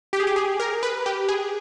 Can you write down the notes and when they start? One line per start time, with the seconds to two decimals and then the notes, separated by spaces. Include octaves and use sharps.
0.13 G4
0.20 G#4
0.27 G4
0.36 G#4
0.60 A#4
0.83 B4
1.06 G4
1.29 G#4